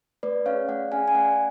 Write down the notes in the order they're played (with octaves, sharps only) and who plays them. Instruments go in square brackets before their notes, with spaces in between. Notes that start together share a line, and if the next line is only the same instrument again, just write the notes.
[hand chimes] A3 B4 D5
C#4 G#4 C#5 F5
A3 D5 F#5
C#4 G#4 F5 G#5
G#5
A3 D5 F#5